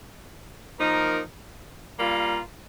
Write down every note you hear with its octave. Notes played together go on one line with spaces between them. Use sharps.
F3 A#3 D#4 A#4
G3 A#3 F4 A#4